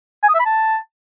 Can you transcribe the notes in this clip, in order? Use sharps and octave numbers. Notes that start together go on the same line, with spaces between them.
G#5
D#6
E5
B5
A5